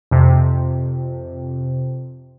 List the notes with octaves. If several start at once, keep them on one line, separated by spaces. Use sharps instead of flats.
F2 C3